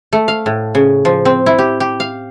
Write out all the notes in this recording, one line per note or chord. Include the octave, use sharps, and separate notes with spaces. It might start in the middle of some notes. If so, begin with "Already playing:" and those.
A3
F5
A2
C#3
F3
C4
E4
G4
G4
F5